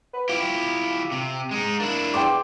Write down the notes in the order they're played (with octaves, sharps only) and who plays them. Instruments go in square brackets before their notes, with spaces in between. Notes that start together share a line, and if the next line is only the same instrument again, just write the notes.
[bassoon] B4
[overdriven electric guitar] E4 G4 [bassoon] F4
[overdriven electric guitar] C3
G#3 D#4
[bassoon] A#3 [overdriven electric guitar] D4 E4
[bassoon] E2 [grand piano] G5 C6 D6